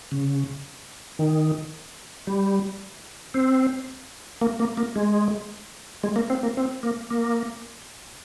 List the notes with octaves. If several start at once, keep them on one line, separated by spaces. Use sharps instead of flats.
C#3
D#3
G3
C4
A#3
A#3
A#3
G#3
G#3
A#3
C4
A#3
C4
A#3
A#3